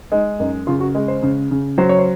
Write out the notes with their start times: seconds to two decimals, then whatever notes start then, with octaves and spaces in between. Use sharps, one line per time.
0.12 G#3 D#4
0.40 F#2 D#4
0.67 C#3 F4
0.80 F#4
0.95 G#3 G#4
1.08 C5
1.23 C#3
1.51 C#3
1.78 F#3 C5
1.89 C#5
1.99 C5